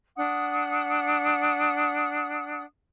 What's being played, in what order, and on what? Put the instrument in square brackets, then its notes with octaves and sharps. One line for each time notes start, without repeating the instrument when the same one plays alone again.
[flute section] D4 F#5 D#6